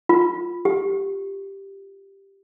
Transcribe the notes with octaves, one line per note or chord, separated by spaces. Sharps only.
F4
G4